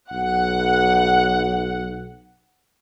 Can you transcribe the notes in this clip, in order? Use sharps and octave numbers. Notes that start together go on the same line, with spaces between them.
B1 F#5